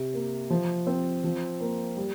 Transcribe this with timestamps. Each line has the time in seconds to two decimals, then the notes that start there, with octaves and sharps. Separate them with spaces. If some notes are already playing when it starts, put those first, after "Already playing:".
Already playing: C3
0.14 A#3
0.50 F3
0.87 C4
1.24 F3
1.60 A#3
1.97 G3